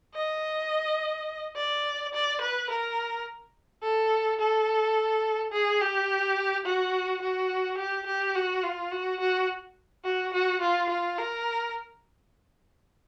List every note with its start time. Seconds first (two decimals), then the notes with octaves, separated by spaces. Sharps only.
0.15 D#5
1.56 D5
2.13 D5
2.41 B4
2.70 A#4
3.83 A4
4.40 A4
5.52 G#4
5.81 G4
6.65 F#4
7.22 F#4
7.78 G4
8.06 G4
8.35 F#4
8.63 F4
8.91 F#4
9.20 F#4
10.04 F#4
10.33 F#4
10.61 F4
10.89 F4
11.18 A#4